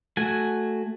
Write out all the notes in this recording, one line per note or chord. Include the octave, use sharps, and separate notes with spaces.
A3 F#4 G#5